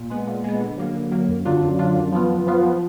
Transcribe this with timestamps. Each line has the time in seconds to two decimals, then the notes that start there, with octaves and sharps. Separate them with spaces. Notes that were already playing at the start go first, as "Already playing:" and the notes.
Already playing: A#2
0.10 G#3 B3
0.27 A#2
0.44 G#3 B3
0.61 D3
0.78 F#3 A#3
0.95 D3
1.12 F#3 A#3
1.28 F#2
1.45 D3 F#3 D4 F4
1.62 F#2
1.79 D3 F#3 D4 F4
1.96 F#2
2.12 F3 B3 F4
2.30 F#2
2.47 F3 B3 F4
2.63 F3